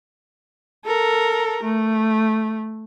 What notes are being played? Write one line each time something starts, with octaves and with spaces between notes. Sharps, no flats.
A4 A#4
A3